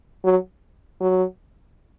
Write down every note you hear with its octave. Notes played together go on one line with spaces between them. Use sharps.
F#3
F#3